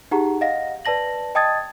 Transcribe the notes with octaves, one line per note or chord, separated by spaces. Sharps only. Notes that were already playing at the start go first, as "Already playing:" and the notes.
D#4 G4 G#4 F#5 A#5
D#5 F5 F#5 A#6
B4 D5 A5 A#6 F#7
D#5 G5 A5 D#6 G#6 A6